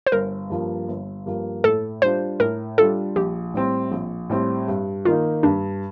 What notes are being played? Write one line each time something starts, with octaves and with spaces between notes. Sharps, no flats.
C5
G1 A#4
G2 F3 A#3
G1
G2 F3 A#3
A2 A4
G3 D4 F4 C5
A2 A#4
G3 D4 F4 A4
A#1 G4
A2 G3 C4
A#1
A2 G3 C4
G2
D#3 A#3 D#4 F4
G2 D4